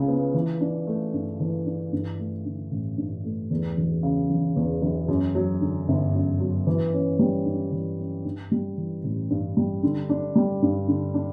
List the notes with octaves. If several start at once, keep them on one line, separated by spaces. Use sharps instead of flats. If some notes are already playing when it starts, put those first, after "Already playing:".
Already playing: C#2 C#3
B3
E3
D4
A3
G2
E3
D4
G2
A3
D3
A1
G2
A3
E2
E1
C#3
E1
E2
E1
F#2
F#3
D3
G1
F#2
F#3
E3
C#4
G3
G2
E3
C#4
G2
G3
E3
A1
G2
G3
D3
D4
G3
G2
D3
D4